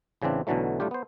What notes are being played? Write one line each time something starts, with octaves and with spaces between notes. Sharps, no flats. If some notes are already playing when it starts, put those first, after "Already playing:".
A1 C#3 E3 C4 D4
B1 B2 D3 E3 F#3 A3
A2 G3 A3 D4 F4 G4
B3 C5